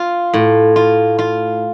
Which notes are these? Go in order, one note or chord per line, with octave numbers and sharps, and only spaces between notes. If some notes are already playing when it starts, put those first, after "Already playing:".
Already playing: F4
A2
F4
F4